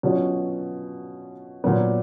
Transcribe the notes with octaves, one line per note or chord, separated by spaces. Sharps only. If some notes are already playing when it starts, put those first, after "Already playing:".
B2 F#3 C#4 F4
A#2 F#3 B3